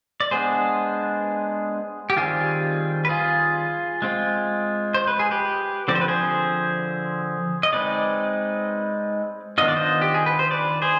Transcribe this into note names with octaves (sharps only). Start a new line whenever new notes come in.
D5
G#3 B3 D4 G#4 C5
G4
D#3 G3 C4 F4 G#4
B4
F4 G#4
G#3 C4 F4
C5
B4
G#4
G4 B4
D3 F3 C4 D5
C5
B4
G#4 C5
D#5
G#3 C4 D#4 B4 D5
D#3 B3 D4 F4 D#5
D5
C5 D#5
G4
G#4
B4
C5
B4 D5
G#4 C5